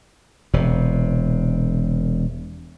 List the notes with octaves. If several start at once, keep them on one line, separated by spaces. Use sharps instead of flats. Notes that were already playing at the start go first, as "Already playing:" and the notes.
E1 C3